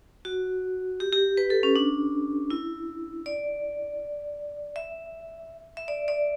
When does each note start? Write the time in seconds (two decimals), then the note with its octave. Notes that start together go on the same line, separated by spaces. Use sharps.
0.25 F#4
1.00 G4
1.13 G4
1.37 B4
1.50 A4
1.63 C#4
1.76 D4
2.50 E4
3.26 D5
4.76 E5
5.77 E5
5.88 D5
6.08 D5